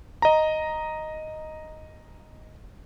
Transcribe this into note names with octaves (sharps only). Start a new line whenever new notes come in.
D#5 A#5